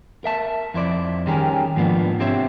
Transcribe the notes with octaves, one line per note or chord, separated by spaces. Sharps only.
A#4 E5 A5
F2 E4 C5 D5
D#3 G3 C#4 G4 G#4 A#4
G#2 F3 A#3 B3 D4
C4 D4 G4 C5 C#5 E5